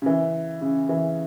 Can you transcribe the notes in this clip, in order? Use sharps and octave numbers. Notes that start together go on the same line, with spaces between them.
C#3
E3
C#3
E3